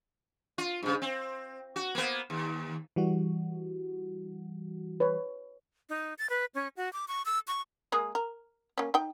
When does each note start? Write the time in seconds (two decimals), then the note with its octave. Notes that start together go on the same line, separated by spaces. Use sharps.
0.58 F4
0.83 G2 C#3
1.02 C4
1.76 F#4
1.95 A#3 B3
2.30 D#2
2.96 E3 G3 F#4
5.00 B4 C#5
5.89 D#4
6.19 A6
6.30 B4
6.55 C#4
6.77 F#4
6.93 D6
7.08 C#6
7.26 E6
7.48 C#6
7.92 G#3 A#3 G#4
8.15 A#4
8.78 A#3 C#4
8.94 D#4 G5